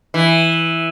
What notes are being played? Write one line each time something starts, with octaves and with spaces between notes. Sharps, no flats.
E3